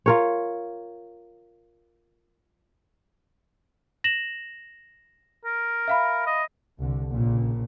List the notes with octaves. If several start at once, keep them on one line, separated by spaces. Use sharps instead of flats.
F4 A#4 C#5
A#6 E7 F#7
A#4
E5 F5 B5
D#5
C2 D3
A#1 A#2 C#3